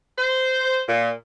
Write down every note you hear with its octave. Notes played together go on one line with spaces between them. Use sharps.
C5
A#2